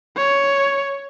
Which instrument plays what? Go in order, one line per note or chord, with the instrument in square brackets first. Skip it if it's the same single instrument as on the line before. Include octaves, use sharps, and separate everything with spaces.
[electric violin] C#5